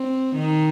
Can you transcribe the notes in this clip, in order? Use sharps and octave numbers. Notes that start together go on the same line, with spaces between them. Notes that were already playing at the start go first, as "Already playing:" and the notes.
Already playing: C4
D#3